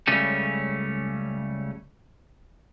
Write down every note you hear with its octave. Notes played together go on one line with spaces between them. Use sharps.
C#2 C#3 G3 A3 C#4